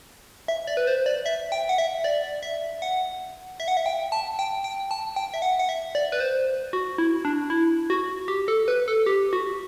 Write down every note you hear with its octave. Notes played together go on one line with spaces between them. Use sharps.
E5
D5
B4
C5
D5
E5
G5
F#5
E5
D5
E5
F#5
E5
F#5
E5
G5
A5
G5
G5
A5
G5
E5
F#5
F#5
E5
D5
B4
C5
F#4
E4
D4
E4
F#4
G4
A4
B4
A4
G4
F#4